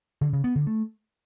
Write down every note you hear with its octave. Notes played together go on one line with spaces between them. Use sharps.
D3
C#3
B3
D3
A3